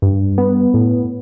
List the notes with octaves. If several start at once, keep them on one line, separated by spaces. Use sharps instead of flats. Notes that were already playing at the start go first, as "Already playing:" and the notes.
G2
B3
A2